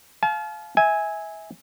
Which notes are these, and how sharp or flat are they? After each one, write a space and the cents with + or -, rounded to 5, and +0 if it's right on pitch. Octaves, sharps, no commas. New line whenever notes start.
F5 +0 A5 -45
E5 -25 G#5 +0